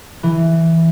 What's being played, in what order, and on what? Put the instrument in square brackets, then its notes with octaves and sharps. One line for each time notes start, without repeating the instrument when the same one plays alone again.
[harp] E3